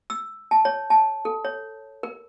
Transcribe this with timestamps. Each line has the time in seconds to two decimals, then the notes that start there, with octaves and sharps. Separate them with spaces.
0.10 E6
0.51 A5
0.65 C#5
0.90 A5
1.25 A4
1.45 C#5
2.03 A#4